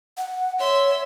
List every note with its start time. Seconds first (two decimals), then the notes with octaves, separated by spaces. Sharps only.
0.17 F#5
0.60 C#5 E5 C6